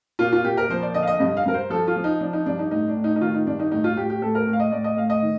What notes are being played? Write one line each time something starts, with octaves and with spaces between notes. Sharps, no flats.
A#2 F4
F4
A#2 G4
A#4
F3 C5
D5
D3 D#5
F5
D#5
G2 D#5
F5
G2 A#4
C5
F3 A4
F4
F3
D#4
F3 D4
D#4
G2 D4
D#4
A2 D#4
D4
A2
D#4
D#4
D#3 F4
D#4
G2 D4
D#4
A2 D#4
F4
A2 G4
G4
A2 A4
A#4
A2
F5
D#5
A2 D5
D#5
A2 F5
D#5
D#3